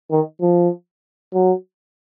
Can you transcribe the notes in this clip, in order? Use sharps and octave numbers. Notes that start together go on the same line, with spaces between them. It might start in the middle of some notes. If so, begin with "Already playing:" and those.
D#3
F3
F#3